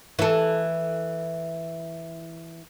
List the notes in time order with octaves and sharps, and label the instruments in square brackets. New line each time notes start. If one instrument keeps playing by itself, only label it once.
[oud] E3 A4